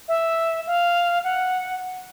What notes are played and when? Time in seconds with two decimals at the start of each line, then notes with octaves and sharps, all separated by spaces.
0.08 E5
0.67 F5
1.24 F#5